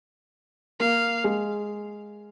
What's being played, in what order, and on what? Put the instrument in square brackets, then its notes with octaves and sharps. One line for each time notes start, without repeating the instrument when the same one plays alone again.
[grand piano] A#3 [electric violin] F5
[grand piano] G#3